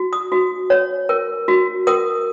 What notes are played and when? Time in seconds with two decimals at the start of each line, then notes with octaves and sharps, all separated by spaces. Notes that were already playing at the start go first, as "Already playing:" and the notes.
Already playing: F#4
0.13 D#6
0.32 F#4
0.70 C#5
1.09 A#4
1.48 F#4
1.87 A#4 D#6